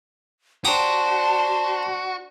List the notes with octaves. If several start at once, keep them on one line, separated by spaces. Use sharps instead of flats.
D4 F#4 G4 C5 A5 A#5 D#6